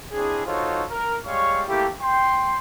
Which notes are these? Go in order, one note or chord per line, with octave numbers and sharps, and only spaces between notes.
C4 D4 E4 G#4
D#4 F4 F#4 A4 C5 C#5
A#4
G3 G#3 C#5 F5 C#6
A3 A#3 E4 G4
G5 C6